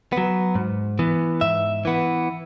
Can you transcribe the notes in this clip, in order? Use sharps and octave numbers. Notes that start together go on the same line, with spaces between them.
F#3 B3
G#2
E3 B3
G#2 E5
E3 B3